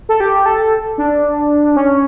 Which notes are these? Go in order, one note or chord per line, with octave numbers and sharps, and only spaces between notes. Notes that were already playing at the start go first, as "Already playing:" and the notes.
A4
G4
A4
D4
C#4